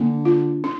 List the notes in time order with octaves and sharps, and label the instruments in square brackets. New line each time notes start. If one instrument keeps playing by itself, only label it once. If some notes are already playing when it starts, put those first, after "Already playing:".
Already playing: [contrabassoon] D3 [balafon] A#3
[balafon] F4
D4